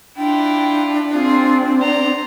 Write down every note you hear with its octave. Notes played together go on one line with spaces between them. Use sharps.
D4 E4 F4 G5
C4 F4 G#4
C5 D5 A#5